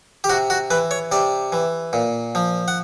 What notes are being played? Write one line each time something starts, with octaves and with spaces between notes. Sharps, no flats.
G4
C3 F#4
F#4
E3 B4
C#5
C3 D5
E3
A#2
F3
F#5